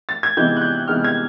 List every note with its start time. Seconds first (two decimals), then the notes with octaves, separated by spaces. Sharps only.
0.09 A6
0.23 G#6
0.37 C3 E3 G#3 B3 D#4 G6
0.57 F#6
0.62 G6
0.88 C3 E3 G#3 B3 D#4 F6
1.04 G#6